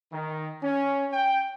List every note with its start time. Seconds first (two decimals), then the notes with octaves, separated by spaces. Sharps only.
0.13 D#3
0.63 C#4
1.13 G5